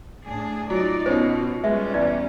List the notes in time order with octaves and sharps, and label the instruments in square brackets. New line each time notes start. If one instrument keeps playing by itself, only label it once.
[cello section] A2 D4 G#4
[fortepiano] F#3 [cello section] D#4 D5 [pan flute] F4
[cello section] B2 [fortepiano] C#4 D#4 [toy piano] C5
[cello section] G3 C#4 [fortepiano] G#3 [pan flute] B4 [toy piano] E5
[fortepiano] E2 E3 [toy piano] D5